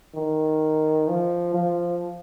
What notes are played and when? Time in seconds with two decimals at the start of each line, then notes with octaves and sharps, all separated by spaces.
0.15 D#3
1.08 F3
1.54 F3